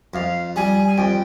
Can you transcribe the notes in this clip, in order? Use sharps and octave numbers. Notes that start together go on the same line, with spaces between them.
F2 F5
G3 G#5
G#5
F2 G5